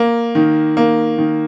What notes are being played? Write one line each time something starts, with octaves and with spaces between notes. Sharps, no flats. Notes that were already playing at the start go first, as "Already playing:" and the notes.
Already playing: A#3
D#3
A#3
D#3